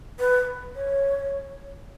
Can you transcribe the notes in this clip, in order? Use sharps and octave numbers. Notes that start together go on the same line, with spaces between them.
B4
C#5